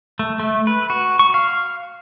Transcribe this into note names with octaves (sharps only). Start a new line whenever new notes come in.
A3
A3
B4
F#4
C#6
F5